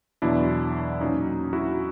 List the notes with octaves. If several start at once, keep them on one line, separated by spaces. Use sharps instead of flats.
E2 B2 F#3 D4 E4
A#2 F#3 C#4 D#4
E4 F#4